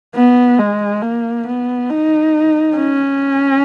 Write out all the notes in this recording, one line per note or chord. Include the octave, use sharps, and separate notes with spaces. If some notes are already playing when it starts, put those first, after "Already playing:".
B3
G#3
A#3
B3
D#4
C#4